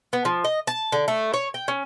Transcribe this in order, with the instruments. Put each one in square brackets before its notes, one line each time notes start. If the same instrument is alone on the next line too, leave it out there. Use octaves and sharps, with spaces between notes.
[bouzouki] B3
F3
D#5
A5
D3
A3
C#5
G5
C#4